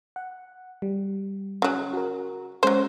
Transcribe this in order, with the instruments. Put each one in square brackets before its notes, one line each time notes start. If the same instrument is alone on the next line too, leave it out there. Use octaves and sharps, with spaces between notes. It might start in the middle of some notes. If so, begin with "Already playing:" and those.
[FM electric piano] F#5
G3
[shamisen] C#3 F#3
[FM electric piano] F#4 A#4
[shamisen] F#3 C5 [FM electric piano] G#3 C#4